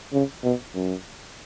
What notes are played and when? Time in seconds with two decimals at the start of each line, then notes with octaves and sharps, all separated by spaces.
0.13 C#3
0.43 B2
0.75 F#2